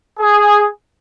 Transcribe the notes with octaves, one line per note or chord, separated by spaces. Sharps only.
G#4